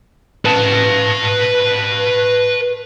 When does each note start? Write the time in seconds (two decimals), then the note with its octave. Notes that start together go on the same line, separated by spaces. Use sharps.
0.45 B4 A5